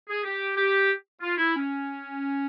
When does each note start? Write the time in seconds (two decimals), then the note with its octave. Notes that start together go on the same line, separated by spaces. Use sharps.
0.09 G#4
0.25 G4
0.57 G4
1.21 F4
1.38 E4
1.54 C#4